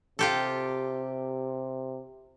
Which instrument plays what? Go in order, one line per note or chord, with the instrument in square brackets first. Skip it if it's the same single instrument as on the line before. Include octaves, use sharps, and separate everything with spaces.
[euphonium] C3 [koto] F4 G4 A4